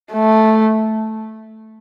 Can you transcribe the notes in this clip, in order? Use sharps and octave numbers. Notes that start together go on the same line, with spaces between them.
A3